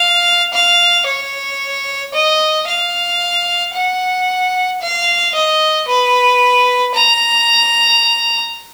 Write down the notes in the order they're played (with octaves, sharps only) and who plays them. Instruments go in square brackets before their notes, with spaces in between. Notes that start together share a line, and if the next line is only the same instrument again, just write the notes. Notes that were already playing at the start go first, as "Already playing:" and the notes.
Already playing: [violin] F5
F5
C#5
D#5
F5
F#5
F5
D#5
B4
A#5